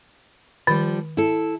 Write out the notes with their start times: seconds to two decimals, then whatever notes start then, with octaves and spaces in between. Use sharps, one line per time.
0.67 D#3 F3 G3
1.17 E4 A4